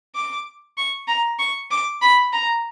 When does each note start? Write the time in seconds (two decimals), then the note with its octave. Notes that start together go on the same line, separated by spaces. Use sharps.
0.15 D6
0.77 C#6
1.08 A#5
1.39 C#6
1.71 D6
2.02 B5
2.33 A#5